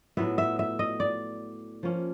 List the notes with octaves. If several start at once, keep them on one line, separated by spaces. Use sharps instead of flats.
A2 F#3 B3 E5
E5
E5
D#5
D5
F3 A#3 C#4